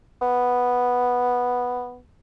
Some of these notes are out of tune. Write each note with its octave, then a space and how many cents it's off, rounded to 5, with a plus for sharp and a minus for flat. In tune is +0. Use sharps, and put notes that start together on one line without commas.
B3 -5